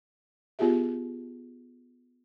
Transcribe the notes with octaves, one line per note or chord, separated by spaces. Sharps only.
B3 F4 G4 G#4 E5